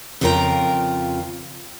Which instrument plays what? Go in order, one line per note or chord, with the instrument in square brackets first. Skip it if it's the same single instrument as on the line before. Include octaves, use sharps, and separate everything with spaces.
[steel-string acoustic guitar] F2 C#3 F4 A#4 G5 A#5